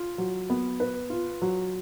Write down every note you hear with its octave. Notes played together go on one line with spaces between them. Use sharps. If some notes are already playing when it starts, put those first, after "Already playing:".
Already playing: F4
F#3
B3
B4
F4
F#3